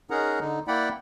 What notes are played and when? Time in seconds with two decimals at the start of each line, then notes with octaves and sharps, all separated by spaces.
0.10 C#4 D#4 G#4 A#4 F#5 A#5
0.40 D3 D#4
0.68 A#3 E4 D5 F#5 G5 B5